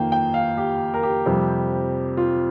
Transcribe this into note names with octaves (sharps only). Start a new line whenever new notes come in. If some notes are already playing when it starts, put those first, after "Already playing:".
Already playing: F2 D#3 A#3 F5 G5
G5
F5
G4
A#4
G4
F2 C3 G3 C4
F4